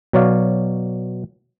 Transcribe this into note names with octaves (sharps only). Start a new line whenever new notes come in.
B2 F#3 C#5 D5 F5